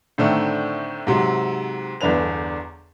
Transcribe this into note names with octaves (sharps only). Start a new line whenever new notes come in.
A2 D3 D#3 A3 C4 D4
G#2 C3 F#3
G1 E2 D3 D4 B4 F7